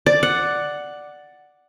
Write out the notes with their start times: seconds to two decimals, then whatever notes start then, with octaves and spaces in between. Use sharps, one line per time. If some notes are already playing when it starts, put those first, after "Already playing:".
0.06 D5
0.23 F#5